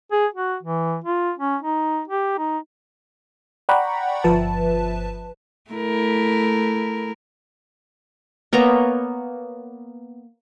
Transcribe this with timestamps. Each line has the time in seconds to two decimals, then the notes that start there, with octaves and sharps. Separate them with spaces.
0.12 G#4
0.34 F#4
0.63 E3
1.04 F4
1.38 C#4
1.62 D#4
2.08 G4
2.38 D#4
3.69 D5 F#5 G5 A#5 B5 C#6
4.24 G1 F3 B4 E5 A5
5.71 A3 E4 A#4
8.53 A#3 B3 C#5 A#5